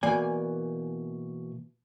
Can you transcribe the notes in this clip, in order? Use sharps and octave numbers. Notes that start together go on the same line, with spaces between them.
B2 E3 A#3 D5 G#5